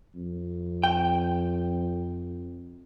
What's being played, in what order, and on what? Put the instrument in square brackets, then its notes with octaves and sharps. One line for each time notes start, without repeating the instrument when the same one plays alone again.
[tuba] F2
[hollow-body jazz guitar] G5